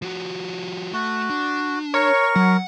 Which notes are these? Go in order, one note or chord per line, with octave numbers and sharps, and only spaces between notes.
F3 F#4
A3 F#4
D4
A#4 C#5 C#6
F#3 F#5